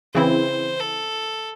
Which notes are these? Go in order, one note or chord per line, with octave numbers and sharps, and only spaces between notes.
C#3 E3 C4 E4 C5
A4